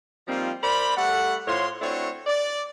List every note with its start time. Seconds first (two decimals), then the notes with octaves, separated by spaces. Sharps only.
0.27 F3 G3 A#3 C4 D#4 F4
0.63 A#4 C5 D5 B5
0.96 G3 A3 A4 F#5
1.47 A2 F4 C5 C#5 C6
1.81 A3 C4 D4 E4 F#4 C#5
2.27 D5